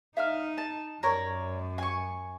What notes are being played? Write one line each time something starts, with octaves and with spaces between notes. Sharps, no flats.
D#4 E5 F5 F6
A5
F#2 A#4 C#5 D5
G#5 C#6